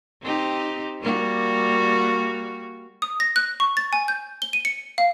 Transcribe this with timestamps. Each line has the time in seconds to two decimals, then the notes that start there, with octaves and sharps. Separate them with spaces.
0.22 C4 D#4 G4
1.01 G3 A#3 F#4
3.02 D#6
3.20 A#6
3.36 F#6
3.60 C#6
3.77 A6
3.93 G#5
4.08 G6
4.42 G7
4.53 D#7
4.65 C#7
4.98 F5